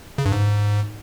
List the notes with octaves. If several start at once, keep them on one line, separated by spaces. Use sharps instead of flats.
C#3
G2
G#2